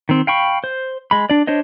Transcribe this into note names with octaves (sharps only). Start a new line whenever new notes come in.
D#3 C4
F5 G5 B5 C#6
C5
G#3 B5
D4 D5
D4 C5 C#5 D#5